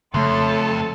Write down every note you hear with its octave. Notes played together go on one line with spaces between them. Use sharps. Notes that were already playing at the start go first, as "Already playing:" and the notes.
F2 C#3 A3 A4 C#5 E5 C6